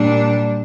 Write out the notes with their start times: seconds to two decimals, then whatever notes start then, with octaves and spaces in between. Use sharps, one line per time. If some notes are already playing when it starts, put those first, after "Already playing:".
Already playing: A#2 G3 D4